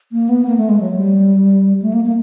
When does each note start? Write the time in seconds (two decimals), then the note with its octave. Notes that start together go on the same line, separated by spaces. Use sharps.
0.12 A#3
0.29 B3
0.47 A#3
0.58 A3
0.69 G#3
0.80 F#3
0.97 G3
1.82 A3
1.93 A#3
2.05 A#3